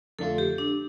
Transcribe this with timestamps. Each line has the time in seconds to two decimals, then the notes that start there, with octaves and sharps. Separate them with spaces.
0.19 F2 D3 A3 D4 F4 A4
0.38 G4
0.58 D4